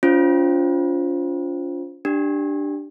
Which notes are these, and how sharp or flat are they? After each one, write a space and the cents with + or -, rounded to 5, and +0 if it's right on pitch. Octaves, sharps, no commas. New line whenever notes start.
C#4 +40 F4 +0 C5 +0
D4 +5 G4 +0